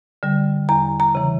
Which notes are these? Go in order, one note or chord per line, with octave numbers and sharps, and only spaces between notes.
D3 G3
E2 A#5
A#5
C#3 E3